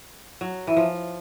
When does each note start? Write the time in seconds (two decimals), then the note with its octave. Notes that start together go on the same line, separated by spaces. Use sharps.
0.41 F#3
0.67 E3
0.77 F3